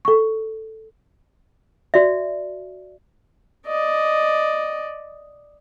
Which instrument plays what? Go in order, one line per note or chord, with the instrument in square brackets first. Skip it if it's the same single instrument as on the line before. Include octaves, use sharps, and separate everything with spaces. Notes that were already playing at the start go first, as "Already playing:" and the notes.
[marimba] A4 C#6
[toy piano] F#4 D5 E5
[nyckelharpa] D5 D#5